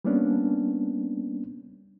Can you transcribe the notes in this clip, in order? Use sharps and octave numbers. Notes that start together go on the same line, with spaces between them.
G3 A#3 B3 C#4 D4